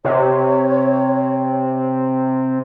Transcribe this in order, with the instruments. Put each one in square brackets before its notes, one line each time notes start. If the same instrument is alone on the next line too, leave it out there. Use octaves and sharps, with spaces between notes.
[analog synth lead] C3 [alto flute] C#5